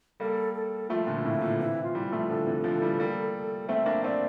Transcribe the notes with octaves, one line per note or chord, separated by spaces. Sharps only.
G3 A#3 A4
A4
F3 A3 F4
A#2 D3
A2 C3 E4
A#2 D3
C3 E3 E4
F4
E3 G3
F4
F3 A3
D3 F3 A4
C3 E3
D3 F3
E3 G3
G3 A#3
A3 C4 E5
A#3 D4
A3 C4 D5